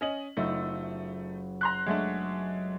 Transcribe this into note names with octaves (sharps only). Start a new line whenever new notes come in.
C#4 D#5 F#7
F#1 A3 D#4 F4 E6
A#5 C6 F#6
F#3 G#3 A3 D4